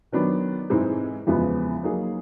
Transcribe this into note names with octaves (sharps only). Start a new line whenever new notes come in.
D#3 F#3 B3 D4
G#2 E3 G#3 C4 D#4
E2 C#3 F3 G#3 B3
F#3 A#3 D#4 G#4